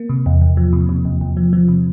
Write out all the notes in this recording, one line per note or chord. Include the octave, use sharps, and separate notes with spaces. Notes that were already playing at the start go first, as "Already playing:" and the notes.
Already playing: A#3
C3
E2
E2
F3
C3
C3
E2
E2
F3
F3
C3